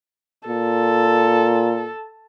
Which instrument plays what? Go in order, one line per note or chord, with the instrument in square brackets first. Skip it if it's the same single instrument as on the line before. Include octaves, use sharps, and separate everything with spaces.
[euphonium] A#2 [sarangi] A4